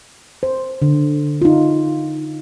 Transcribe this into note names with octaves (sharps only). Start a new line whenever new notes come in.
C5
D3
D#4 F4